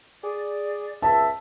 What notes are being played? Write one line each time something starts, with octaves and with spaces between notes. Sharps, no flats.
G#4 D5
C#2 E5 A5